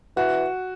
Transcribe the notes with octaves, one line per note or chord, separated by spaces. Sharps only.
E3 F#4